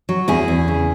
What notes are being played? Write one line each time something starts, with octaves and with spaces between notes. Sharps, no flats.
F#3
E2 E4 G#4
E2
C#3